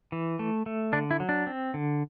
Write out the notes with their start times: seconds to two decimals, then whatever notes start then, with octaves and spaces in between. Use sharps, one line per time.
0.12 E3
0.39 A3
0.66 A3
0.93 D3 D4
1.11 E4
1.20 F#3
1.29 D4
1.47 C4
1.74 D3